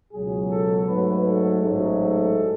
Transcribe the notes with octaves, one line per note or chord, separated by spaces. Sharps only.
C#2 B2 F#3 G#4
A4
G#2 F#3 A3 B4
A4
A1 G#2 F#3 A3
A4